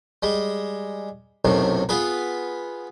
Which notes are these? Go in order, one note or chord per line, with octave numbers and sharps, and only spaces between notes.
G3 G#3
B1 F#2 A2 C3
B3 F4 G#4 B4